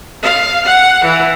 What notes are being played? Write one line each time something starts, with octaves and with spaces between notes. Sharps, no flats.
F5
F#5
E3